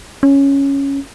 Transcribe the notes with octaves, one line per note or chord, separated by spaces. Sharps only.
C#4